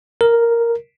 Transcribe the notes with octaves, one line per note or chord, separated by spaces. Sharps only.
A#4